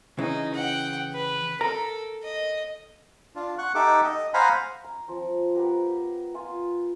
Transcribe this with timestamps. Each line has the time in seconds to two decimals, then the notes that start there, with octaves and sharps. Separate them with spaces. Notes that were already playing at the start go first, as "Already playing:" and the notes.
0.19 C#3 E3 D#4
0.54 F#5 G5
1.13 B4
1.61 A4 A#4 A#5
2.23 D#5
3.36 D4 F4
3.58 F#5 C#6 F#6
3.75 D#4 G4 A4 E5 F#5 D6
4.04 D#5
4.34 C5 F5 F#5 G#5 A#5 B5
4.84 A#5
5.08 F3 C4
5.55 B3 G4 A#4
6.34 F4 F5 G#5